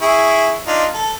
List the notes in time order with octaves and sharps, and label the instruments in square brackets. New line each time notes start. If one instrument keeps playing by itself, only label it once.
[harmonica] E4 G#4 C#6
D4 D#4 F4
A4